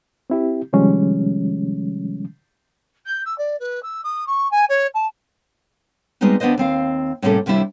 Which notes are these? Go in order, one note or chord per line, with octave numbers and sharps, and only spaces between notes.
C4 E4 G4
C3 D#3 F3 G3 G#3 C#4
G6
E6
D5
B4
E6
D#6
C#6
G#5
C#5
A5
G3 G#3 B3 C4 D#4 F#4
D#2 B3 D4 B4 C5 D#5
D#2 C4 F5
A2 C3 G3 A#3 C#4 A4
D#2 C3 G3 D4 E4 G4